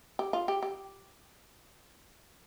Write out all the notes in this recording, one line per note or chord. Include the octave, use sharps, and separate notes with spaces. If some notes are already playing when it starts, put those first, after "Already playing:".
G4
F4
G4
G4